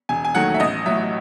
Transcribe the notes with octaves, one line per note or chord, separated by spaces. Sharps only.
E1 G#5
G#5
D#2 D#3 F#3 A3 F#5
E5
A1 D#5
A2 F#3 E5